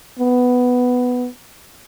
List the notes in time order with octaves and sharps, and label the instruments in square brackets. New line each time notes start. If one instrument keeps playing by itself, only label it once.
[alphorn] B3